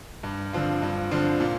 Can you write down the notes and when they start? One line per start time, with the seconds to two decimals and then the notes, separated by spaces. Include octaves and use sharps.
0.23 G2
0.53 D3 F3 C4 F4
0.82 G2
1.11 D3 F3 C4 F4
1.41 A#2